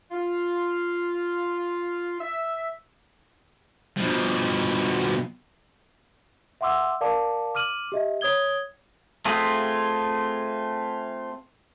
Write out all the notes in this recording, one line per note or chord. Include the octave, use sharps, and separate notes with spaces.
F4
E5
B2 F3
E5 F#5 C6 D6 E6
A#4 D5 F5 A5 D6
D6 F6 D#7 F#7
G4 D#5 E5
C#5 D#6 G#6 G7
A3 C4 F4 G#4